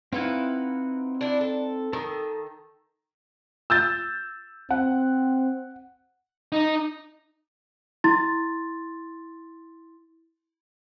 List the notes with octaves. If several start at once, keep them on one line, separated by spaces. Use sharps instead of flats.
C4 D#4 E4 B4 F5 F#5
D4 E4
A4
D#3 A4 D#6
E6 G6 A6
C4 F#5
D#4
E4 C6 A6